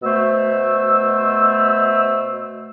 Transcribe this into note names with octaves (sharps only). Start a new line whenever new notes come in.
B2 A3 C5 E6